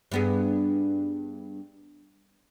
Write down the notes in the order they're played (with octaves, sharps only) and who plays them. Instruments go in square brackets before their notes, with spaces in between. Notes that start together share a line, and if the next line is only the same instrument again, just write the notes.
[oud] G2 B3 G#4